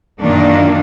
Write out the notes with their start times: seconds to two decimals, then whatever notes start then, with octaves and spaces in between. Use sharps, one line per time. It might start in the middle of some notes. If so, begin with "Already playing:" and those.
0.21 F#2 A#2 D#3 A#3 D4